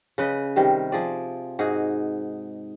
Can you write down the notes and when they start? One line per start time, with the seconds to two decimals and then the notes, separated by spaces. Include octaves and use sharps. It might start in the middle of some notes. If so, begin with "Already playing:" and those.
0.18 C#3 B4 D#5
0.56 C3 D#3 G3
0.92 F3 G#4 D5
1.59 G#2 D#4 F#4 G#4